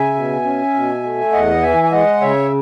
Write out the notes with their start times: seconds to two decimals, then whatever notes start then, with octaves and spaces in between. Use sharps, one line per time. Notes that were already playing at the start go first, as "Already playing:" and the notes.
Already playing: C#3 E5 G#5
0.15 B2
0.44 C#4
0.74 B2
1.03 A3
1.32 E2 D#5 F#5
1.63 E3 E5 G#5
1.83 G#5
1.91 G#3 D#5 F#5
2.21 C#3 C#5 E5